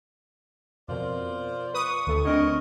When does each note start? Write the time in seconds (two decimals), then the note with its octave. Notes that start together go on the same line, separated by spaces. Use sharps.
0.88 F2 B2 F4 A#4 C5 D5
1.74 B4 C#6 D#6
2.07 D2 A3
2.25 D3 C4 D4 A#4 C#5 D#5